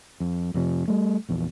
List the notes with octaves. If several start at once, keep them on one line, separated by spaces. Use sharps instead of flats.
F2
F2 C3 F3
G3 A3
A#1 E2